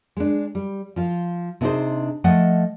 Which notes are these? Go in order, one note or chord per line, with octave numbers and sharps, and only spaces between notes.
G#3 D4
G3
F3 F4
C3 B3 D4 D#4 G#4 C5
F3 A3 D#5 F#5